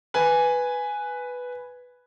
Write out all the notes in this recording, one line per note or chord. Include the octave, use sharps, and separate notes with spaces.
B4 G#5